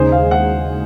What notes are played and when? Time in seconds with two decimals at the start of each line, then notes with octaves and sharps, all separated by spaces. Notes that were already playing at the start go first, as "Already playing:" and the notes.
Already playing: D#2 C#3 G#3 D#4 G#4 C5
0.12 F5
0.31 F#5